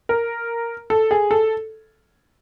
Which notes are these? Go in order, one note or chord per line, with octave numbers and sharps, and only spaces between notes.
A#4
A4
G#4
A4